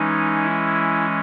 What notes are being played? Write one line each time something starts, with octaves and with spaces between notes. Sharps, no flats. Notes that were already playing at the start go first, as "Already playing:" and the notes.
Already playing: E3 G#3 C#4 D#4
E4